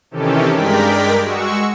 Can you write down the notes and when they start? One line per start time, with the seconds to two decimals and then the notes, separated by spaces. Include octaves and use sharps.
0.11 C3 D#3 E3 C#4 G4 A4
0.49 G2 G#3 A#4 D5 G5 B6
1.22 G#3 F#4 C#6 E6